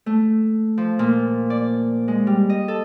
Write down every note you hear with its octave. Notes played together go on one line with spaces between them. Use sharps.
A3
F3
A#2
D5
G#3
G3
D#5
A4